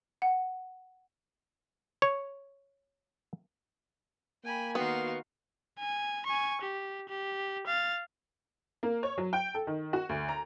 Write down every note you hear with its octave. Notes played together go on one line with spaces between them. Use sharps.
F#5
C#5
A#3 G5 G#5 B5
D#3 B3 F#4 F5 C6
G#5
G#5 C#6
G4
G4
F5 A6
A#3
C#5
F#3
G5
A4
D#3
F#4
D2
A#5